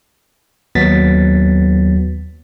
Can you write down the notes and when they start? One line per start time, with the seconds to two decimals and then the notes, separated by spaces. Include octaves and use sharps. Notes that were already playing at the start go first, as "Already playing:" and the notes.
0.75 D#2 F#3 B3 A6 B6